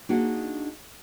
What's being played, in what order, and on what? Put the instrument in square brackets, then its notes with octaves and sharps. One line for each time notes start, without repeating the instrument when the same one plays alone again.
[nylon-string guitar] A#3 D4 D#4 F#4 G#4 F#5